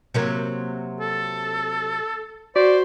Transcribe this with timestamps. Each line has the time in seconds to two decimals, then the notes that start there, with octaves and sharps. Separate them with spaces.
0.14 C3 F#3 A#3
1.00 A4
2.56 F#4 C5 D5